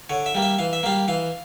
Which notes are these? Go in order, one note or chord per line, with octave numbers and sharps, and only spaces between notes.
D3 C#5
E5
G3 A#3
E5
E3 F5
E5
G3 A#3 F5
E3 F5